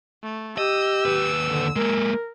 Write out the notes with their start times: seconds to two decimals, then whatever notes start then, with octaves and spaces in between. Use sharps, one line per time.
0.23 A3
0.58 G4 D#5 E6
1.05 D#2 B4
1.45 D3
1.76 G#3 A#3 A#4